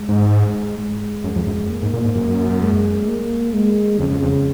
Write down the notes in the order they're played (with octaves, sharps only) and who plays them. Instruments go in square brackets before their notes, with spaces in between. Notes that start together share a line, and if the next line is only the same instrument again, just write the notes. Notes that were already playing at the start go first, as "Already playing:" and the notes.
Already playing: [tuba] G#3
[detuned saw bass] G#2
[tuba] G#3
[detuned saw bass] F#2
F2
F#2
[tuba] A#3
[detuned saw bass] G#2
A#2
G#2
F#2
[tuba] G#3
A#3
G#3
[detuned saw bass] F2 [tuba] C#3
[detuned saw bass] F2
F2